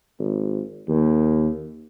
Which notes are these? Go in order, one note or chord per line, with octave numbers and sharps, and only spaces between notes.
G#1
D#2